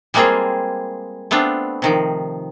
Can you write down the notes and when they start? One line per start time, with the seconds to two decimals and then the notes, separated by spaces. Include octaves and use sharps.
0.14 G3 G#3 A#3 C4 F4 G#4
1.31 A3 B3 C4 D4 F4
1.82 C3 D#3 F3